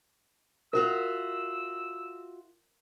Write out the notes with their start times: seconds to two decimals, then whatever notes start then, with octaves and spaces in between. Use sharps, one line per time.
0.73 F4 F#4 A#4 E5 E6